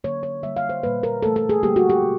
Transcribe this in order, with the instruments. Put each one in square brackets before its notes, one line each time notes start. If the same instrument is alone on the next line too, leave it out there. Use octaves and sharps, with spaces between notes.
[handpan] D3 F#3 A#3 C#5
C#5
D3 G3 A#3 E5
F5
C5
A#2 G3 A#3 B4
A#4
C3 E3 A3 A4
A4
G#4
D3 G3 A#3 G4
F#4
G4
B2